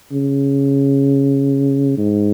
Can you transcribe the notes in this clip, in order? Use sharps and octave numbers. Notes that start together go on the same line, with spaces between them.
C#3
G#2